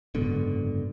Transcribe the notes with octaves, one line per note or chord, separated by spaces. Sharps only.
F#1 G#2 B2 D3